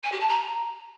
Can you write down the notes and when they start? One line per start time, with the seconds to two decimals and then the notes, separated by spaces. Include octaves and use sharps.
0.04 G#5
0.12 G4
0.20 A5
0.29 A#5